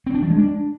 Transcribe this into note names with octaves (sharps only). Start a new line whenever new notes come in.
C4
D4
F3
G#3
D4